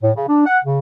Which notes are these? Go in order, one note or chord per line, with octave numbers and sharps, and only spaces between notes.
A2
C#3
D4
F#5
C#3